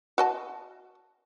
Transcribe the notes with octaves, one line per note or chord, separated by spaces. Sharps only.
F#4 D#5 A5